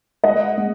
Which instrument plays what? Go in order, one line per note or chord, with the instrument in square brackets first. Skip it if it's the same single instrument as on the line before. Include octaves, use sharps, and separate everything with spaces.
[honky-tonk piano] G#3 D#5 F#5
G#3